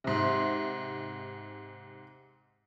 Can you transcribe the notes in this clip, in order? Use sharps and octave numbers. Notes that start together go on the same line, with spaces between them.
G#2 C3